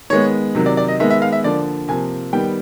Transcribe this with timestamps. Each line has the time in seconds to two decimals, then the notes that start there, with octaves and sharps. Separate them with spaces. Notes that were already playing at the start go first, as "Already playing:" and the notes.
0.10 D#3 G#3 B3 C#5
0.55 C3 D#3 F#3
0.66 D5
0.77 D5
0.88 D#5
1.00 D#3 G#3 B3 E5
1.10 E5
1.22 F5
1.32 E5
1.44 D3 F3 A#3 D5
1.88 C3 F3 A#3 G#5
2.33 D#3 G3 B3 G5